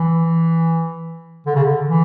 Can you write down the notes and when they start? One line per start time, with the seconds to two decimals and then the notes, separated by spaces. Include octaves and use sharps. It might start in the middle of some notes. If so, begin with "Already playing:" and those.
Already playing: E3
1.46 D3
1.55 C#3
1.64 D3
1.87 E3